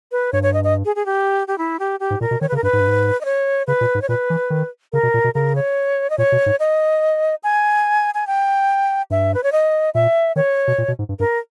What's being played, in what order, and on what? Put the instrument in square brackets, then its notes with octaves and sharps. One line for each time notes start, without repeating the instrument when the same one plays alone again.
[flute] B4
[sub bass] G2 [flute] C#5
[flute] C#5
D#5
D#5
G#4
G#4
G4
G4
E4
G4
G4
[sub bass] G#2
[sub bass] A#2 [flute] A#4
[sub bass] B2
[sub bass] D#3 [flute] C#5
[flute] B4
[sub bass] C#3
[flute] A#4
[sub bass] G2 [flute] B4
[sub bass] G#2
G2
G#2
[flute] D#5
C#5
[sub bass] C#3 [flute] B4
[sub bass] A#2
G#2
[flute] C#5
[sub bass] A#2 [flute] B4
[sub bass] E3
D#3
[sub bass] C#3 [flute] A#4
[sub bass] B2
A#2
B2
[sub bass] C#3 [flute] A#4
[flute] C#5
D#5
[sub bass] A#2 [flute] C#5
[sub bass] B2
G#2
[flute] D#5
G#5
G#5
G5
[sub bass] G2 [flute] E5
[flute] B4
C#5
D#5
[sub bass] A#2 [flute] E5
[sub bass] D#3 [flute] C#5
[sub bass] B2
A#2
B2
G#2
G2
[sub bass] G2 [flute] A#4